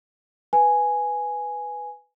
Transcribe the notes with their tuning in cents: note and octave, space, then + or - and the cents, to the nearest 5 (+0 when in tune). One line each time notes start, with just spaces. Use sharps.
B4 +0 G#5 +0